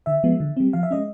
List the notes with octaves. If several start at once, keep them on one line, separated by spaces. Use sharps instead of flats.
D3 E5
F3 G#3 B3
D3
G3 C4
F3 F5
E5
G#3 C#4 D#5